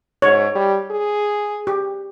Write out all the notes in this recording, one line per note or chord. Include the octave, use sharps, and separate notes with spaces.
G#2 C#5
G3
G#4
G4